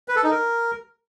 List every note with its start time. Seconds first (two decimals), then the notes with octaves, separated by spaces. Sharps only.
0.08 B4
0.16 A4
0.24 D#4
0.31 A#4